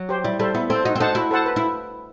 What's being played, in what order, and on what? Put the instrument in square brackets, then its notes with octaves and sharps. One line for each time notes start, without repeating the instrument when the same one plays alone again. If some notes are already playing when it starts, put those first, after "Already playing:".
Already playing: [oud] F#3
[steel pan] G4 C5
[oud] G3 [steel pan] E4
[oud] G3 [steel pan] A4 C5
[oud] B3 [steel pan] E4
[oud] C4 [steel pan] A4 C5
[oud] D#4 [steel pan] F#4
[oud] C4
[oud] D#4 [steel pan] A4 C5 F#5 A5
[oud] E4 [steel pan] F#4
[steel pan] A4 C5 F#5 A5
B4
[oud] E4